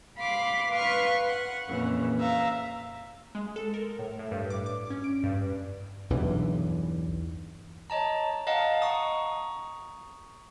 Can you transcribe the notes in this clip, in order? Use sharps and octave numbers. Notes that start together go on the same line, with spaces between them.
F5 B5 C6 D6
B4 F5 C6 C#6 F6
F#5
F2 A#2 C#3 E3
E5 F5 A#5
G#3
A4
A#4
A2
A2
G2
D6
D6
C#4
D7
G2
B1 E2 G2 E3
C#5 D#5 A5 A#5
D#5 F5 F#5 A5 A#5
A#5 C#6 D#6